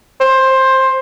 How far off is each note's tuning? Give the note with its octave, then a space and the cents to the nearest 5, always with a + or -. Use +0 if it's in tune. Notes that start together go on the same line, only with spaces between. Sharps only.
C5 +15